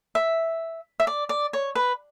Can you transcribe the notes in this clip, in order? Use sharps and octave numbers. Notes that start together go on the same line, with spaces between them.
E5
E5
D5
D5
C#5
B4